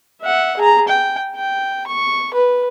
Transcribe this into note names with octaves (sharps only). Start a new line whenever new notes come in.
E5 F#5
G#4 A#5
G5
G5
C#6
B4